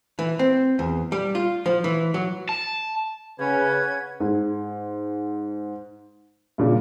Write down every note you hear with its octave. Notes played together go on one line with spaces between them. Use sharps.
E3
C4
E2
G3
F4
F3
E3
F#3
A5
C#3 C#4 B4 F#5 G#6
G#2
G2 A#2 C#3